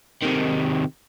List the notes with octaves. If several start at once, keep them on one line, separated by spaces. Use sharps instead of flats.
C3 D#3